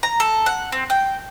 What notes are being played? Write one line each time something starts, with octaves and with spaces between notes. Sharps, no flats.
A#5
A4
F#5
C4
G5